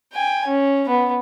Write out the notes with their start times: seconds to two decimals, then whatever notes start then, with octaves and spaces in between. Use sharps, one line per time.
0.13 G5 G#5
0.46 C#4
0.88 B3